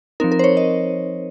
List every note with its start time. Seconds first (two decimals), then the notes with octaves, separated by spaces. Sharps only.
0.20 F3 C4 D#4 A#4
0.32 A#4
0.39 C5
0.44 C#5
0.57 D#5